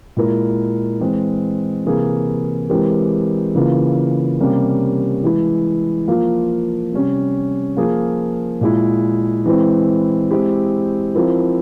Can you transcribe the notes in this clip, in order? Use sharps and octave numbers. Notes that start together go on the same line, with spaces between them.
A#2 G#3 E4 A#4
E3 G#3 C4
C3 E3 A#3 E4 G#4
E3 G#3 C4 G4 A#4
C#3 E3 A#3 F4
C3 G3 A#3 C#4
E3 G#3 E4
F3 A#3 F4
C3 G3 C#4
F3 A#3 F4 G#4
A#2 G#3 E4
E3 G#3 C4 E4
G#3 C4 E4 G4
F3 C4 E4 A#4